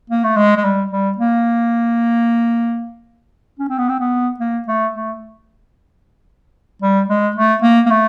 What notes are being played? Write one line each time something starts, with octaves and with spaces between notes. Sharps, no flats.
A#3
A3
G#3
G#3
G3
G3
A#3
C#4
C4
B3
C4
B3
A#3
A3
A3
G3
G#3
A3
A#3
A#3
A3